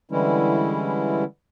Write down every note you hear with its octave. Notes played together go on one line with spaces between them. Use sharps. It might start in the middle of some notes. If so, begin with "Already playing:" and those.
D3 E3 G3 G#3 C#4 E4